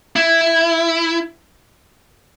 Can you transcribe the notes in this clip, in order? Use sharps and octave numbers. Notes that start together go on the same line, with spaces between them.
E4